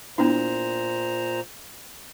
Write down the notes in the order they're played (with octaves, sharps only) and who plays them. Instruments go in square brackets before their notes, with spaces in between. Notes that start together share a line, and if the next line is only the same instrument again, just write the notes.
[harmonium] A#2 C5 A#5 [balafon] B3 D4 E4